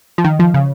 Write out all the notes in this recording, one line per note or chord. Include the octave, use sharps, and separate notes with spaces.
F3
D#3
F3
C#3